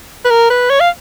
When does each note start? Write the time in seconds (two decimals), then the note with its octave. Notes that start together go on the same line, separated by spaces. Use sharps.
0.25 B4
0.30 A#4
0.50 B4
0.70 C#5
0.80 F5